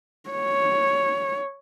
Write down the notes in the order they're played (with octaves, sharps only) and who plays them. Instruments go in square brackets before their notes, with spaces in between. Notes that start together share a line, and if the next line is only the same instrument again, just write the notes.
[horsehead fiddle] C#5